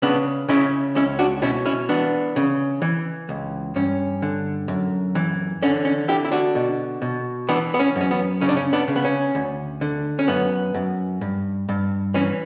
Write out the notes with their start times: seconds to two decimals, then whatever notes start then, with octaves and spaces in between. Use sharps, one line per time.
0.02 C#3 B3 D4
0.49 C#3 C#4 E4
0.95 C#2 C#4 E4
1.19 D4 F#4
1.42 B2 C#4 E4
1.66 C#4 E4
1.89 E3 B3 D4
2.36 C#3
2.82 E3
3.29 C#2
3.76 G2 C#4
4.22 D3
4.68 F#2
5.15 E3
5.62 D3 C#4
5.85 C#4
6.08 D3 E4 G4
6.25 E4
6.32 D4 F#4
6.55 B2
7.02 B2
7.49 E3 B3 D4
7.74 B3
7.79 C#4
7.96 F#2 C#4
8.11 B3
8.41 C#3 C#4
8.49 D4
8.57 C#4
8.73 B3 D4
8.88 C#3
8.96 B3
9.05 C#4
9.35 D2
9.81 D3
10.19 C#4
10.28 F#2 B3
10.74 F#2
11.21 G2
11.69 G2
12.14 E3 C#4